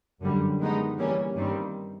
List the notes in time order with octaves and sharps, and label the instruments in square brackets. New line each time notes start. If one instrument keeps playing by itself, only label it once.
[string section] F#2 D3 G3
D#3 G#3 B3 D#4
E3 G3 A#3 C#4
G2 D#3 G3 C4